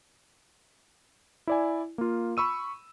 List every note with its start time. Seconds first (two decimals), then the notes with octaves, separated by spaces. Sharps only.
1.47 E4 D5 G#5
1.98 A#3 F4
2.37 B5 C#6 E6 D#7